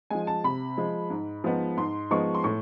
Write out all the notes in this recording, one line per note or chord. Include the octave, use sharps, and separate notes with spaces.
F3 G#3 G#5
A5
C3 B5
F3 G#3
G#2
F3 G#3 B3 D#4
G#2 C6
F3 G#3 B3 D#4 C#6
C6
A2 C#6